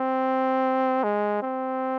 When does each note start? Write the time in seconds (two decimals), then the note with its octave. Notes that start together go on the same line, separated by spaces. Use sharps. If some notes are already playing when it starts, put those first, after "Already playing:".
Already playing: C4
1.04 G#3
1.42 C4